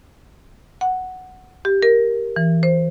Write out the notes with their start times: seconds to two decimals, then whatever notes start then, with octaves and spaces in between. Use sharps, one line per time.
0.81 F#5
1.65 G4
1.82 A#4
2.36 E3
2.63 C5